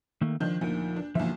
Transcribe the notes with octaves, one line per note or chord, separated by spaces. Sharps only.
D#3 A3 A#3
D#3 F3 D4 G6
D2 A#2 F3 D#4 A#4
D4
B1 A#2 D3 E3 F3 E5